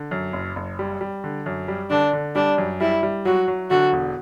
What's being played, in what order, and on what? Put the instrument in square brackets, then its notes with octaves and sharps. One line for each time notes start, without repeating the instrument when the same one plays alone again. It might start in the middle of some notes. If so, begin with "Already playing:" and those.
Already playing: [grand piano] D3
F#2
F#1
F#1
G3
G3
D3
F#2
G3
[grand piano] D3 [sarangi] D4
[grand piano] D3
[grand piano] G3 [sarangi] D4
[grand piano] F#2
[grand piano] G3 [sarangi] E4
[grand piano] G3
[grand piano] F#3 [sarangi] F#4
[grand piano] F#3
[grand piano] D3 [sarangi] F#4
[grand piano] E1